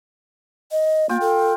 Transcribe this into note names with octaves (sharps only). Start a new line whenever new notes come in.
D#5
A#3 F4 G5
A4